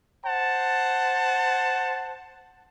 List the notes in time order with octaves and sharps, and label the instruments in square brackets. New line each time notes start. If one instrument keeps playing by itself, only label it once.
[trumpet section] C5 F#5 A5